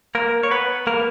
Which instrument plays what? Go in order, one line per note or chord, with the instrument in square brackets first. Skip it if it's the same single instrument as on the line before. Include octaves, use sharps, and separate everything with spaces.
[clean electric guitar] A#3 A#4
C#5
B3 B4
A#3 A#4